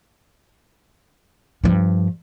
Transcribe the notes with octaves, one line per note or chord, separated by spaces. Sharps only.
G2 F3